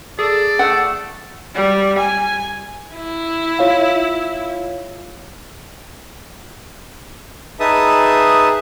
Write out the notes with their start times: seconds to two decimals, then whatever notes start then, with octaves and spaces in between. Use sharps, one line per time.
0.19 G#4 A4 D5
0.59 A3 F#5
1.55 G3
1.98 G#5
2.96 E4
3.59 F4 C#5 F5
7.60 D#4 G#4 B4 E5 A5 D#6